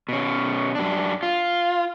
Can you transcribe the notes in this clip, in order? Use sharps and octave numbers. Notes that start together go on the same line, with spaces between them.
B2 C#4
F#2 D4
F4